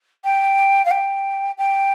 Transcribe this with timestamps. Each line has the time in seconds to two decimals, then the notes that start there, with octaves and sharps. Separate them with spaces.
0.24 G5
0.85 F5
0.91 G5
1.58 G5